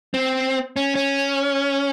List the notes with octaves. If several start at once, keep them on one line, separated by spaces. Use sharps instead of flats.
C4
C#4
C#4